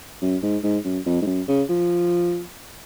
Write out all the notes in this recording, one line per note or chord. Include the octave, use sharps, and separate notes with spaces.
F#2
G#2
G#2
F#2
F2
G#2
F#2
C#3
F3